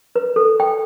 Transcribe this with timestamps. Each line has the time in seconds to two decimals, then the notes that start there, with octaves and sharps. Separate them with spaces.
0.16 B4
0.36 A4
0.60 G5